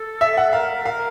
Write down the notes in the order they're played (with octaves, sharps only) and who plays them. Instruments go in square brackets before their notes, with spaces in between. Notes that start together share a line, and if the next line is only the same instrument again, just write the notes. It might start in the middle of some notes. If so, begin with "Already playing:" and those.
Already playing: [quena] A4
[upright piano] E5
F#5
[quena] A#4 [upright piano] F5
[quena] A4
[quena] A#4 [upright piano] F5